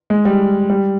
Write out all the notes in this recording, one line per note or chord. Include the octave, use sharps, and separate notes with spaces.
G#3
G3
G3